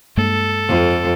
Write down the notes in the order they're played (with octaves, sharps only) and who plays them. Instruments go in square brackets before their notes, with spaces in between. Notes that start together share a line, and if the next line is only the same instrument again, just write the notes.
[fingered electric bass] G2 G#3 A#3 [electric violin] A4
[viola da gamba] F2